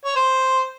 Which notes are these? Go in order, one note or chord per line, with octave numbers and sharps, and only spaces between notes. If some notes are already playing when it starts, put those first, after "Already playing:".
C#5
C5